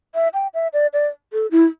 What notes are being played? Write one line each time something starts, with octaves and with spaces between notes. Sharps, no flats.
E5
G5
E5
D5
D5
A4
E4